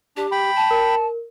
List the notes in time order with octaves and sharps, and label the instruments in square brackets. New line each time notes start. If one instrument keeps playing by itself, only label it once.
[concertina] D4 [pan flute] G4
[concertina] G5 B5
[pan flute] A5
[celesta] A#4